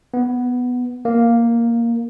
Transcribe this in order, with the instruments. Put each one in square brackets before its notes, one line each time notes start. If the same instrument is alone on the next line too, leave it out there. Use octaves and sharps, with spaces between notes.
[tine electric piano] B3
A#3